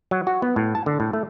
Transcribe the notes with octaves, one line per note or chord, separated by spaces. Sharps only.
F#3
F#4
B3
A2
A5
D3
A2
A3